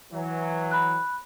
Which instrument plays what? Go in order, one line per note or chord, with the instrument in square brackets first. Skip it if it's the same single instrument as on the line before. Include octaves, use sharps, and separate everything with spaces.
[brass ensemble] E3 F#3
[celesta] B5 F#6